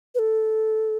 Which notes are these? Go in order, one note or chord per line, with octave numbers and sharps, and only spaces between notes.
B4
A4